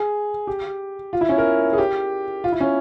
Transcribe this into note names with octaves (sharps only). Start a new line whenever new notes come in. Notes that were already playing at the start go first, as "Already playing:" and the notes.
Already playing: G#4
G4
F4
E4
C#4
A#4
G#4
G4
F4
E4
C#4